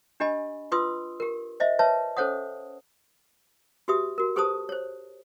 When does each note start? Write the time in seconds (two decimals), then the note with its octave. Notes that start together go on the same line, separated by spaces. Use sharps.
0.20 D4 G4 D#5 G#5 B5
0.72 F4 B4 C6 D#6 E6
1.20 G4 A#4
1.60 C5 D#5 E5
1.79 B4 C#5 E5 A5
2.17 C#4 A4 C5 C#5 F#5 D#6
3.88 F#4 G4 B4 E5 D#6
4.18 F#4 A#4
4.36 G4 A4 B4 C5 A5 D#6
4.69 C5 C#5